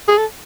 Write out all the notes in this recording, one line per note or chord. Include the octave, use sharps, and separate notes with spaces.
G#4
A4